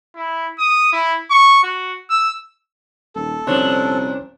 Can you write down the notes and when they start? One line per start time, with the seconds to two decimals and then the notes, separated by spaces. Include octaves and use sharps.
0.15 E4
0.59 D#6
0.92 E4
1.30 C#6
1.63 F#4
2.10 E6
3.15 D#1 A4
3.47 C2 A#2 F3 C#4 D4 C5 C#5